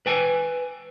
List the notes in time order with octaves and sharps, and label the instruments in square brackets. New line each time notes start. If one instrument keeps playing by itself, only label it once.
[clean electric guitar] B4 G5 G#5